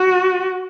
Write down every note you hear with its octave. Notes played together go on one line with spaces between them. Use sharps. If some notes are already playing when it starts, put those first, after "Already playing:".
Already playing: F#4